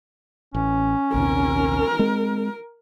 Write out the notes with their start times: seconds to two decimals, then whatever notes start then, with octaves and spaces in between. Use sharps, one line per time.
0.55 A1 C#4
1.14 A#1 D#2 C3 A#4
1.99 G#3 C4